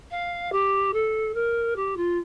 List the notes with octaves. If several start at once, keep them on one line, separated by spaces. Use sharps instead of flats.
F5
G4
A4
A#4
G4
F4